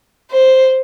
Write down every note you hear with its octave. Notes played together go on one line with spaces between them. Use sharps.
C5